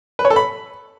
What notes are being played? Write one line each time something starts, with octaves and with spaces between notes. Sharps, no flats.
B4
C#5
A4
B5